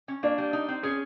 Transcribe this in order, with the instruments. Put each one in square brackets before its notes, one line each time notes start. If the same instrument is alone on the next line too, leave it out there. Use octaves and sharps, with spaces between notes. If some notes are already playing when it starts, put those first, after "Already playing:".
[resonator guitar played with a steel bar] C#4
[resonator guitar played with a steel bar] A#3 [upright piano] D4
[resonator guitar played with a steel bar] G3
D#4
C4
[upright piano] C#4 [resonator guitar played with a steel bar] G#4